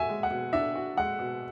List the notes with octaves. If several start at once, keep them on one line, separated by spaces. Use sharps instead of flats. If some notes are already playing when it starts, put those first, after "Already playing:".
Already playing: F#4 E5 G#5
G#3
F#5
B2
D4 E5
F#4
G#3 F#5
B2